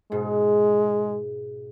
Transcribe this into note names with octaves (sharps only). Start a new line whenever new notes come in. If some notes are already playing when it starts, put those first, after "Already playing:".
G#2 B2 G#3